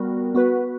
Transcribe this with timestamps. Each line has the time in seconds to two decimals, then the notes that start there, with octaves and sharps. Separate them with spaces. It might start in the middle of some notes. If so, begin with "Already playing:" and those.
Already playing: G3 B3 F#4 A#4
0.35 B3 F#4 B4